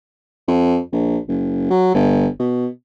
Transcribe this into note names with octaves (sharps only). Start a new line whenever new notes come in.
F2
A#1
F#1
F#3
G1
B2